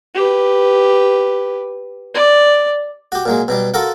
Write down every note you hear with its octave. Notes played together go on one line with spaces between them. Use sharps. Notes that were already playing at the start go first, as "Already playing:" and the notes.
G4 B4
D5
F#4 G4
A#2 F#3 G#3
B2 F#3 G3
F4 F#4 A4 A#4 F#5